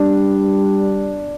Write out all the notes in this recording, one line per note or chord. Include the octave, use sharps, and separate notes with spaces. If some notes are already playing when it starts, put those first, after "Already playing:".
Already playing: G3 D4